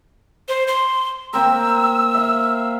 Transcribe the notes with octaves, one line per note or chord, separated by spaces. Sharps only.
C5
C6
A#3 C4 A#4 E6
E5 F5